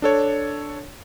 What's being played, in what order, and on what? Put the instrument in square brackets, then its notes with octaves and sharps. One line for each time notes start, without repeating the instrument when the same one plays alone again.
[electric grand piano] D4 A4 C#5